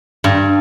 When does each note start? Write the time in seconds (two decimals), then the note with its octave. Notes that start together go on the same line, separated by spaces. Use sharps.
0.24 G2